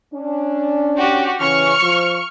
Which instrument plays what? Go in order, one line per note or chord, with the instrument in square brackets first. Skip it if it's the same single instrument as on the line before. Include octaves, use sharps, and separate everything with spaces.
[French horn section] C#4 D4
[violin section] F#4 G4
[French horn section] C#3 E3 C#4 [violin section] C#6 F6 C#7
[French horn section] F3